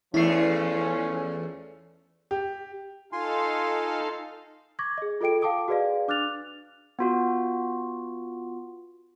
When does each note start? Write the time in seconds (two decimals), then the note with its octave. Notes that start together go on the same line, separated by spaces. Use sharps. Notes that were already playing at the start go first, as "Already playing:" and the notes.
0.14 E2 F3 A3 C#4 E4 C7
2.31 G4
3.12 D#4 F4 A4 F5 G#5 C6
4.79 C#6 D6 G#6 A#6
4.98 G#4 D#5
5.21 F4 A4 D#5 G5 D7
5.42 F5 G5 A5 D6 D#6 D7
5.68 F#4 G#4 B4 D5 D#5 F5
6.08 D4 D6 F6 F#6 A6 F7
6.99 B3 F4 F#4